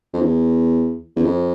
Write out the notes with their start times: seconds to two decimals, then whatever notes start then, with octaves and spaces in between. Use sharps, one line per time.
0.13 F2
0.22 E2
1.16 E2
1.25 F2